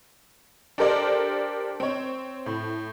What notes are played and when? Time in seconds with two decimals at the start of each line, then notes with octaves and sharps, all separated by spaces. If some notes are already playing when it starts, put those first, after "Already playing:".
0.78 D4 G4 A4 A#4 C5 D5
1.80 C4 C#5
2.46 A2